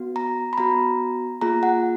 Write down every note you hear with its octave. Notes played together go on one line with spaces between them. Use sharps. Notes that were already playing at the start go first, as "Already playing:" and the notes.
Already playing: B3 F#4
A#5
B5
B3 F#4 A#5
A#3 F4 G#4 A#5
F#5